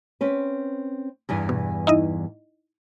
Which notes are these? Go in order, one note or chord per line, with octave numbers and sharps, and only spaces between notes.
C4 C#4 B4
E2 G2 E3
B2
D#4 E4 D#5